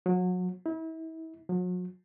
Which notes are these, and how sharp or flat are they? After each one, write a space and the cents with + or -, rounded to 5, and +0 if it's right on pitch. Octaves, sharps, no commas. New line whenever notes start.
F#3 -30
E4 -35
F#3 -40